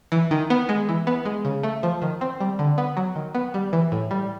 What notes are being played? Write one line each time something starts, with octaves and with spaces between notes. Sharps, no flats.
E3
D#3
B3
G#3
E3
B3
G#3
C#3
A3
F3
D#3
C4
G3
D3
B3
F#3
D#3
B3
G3
E3
A2
G3